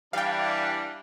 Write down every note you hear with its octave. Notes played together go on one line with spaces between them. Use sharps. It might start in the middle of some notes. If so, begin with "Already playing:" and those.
E3 G3 D4 F5 G5